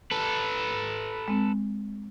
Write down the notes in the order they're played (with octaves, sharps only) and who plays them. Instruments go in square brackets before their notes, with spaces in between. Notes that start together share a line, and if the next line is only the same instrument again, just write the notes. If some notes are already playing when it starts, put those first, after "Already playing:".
[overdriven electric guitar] A4 B4
[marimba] G#3 C4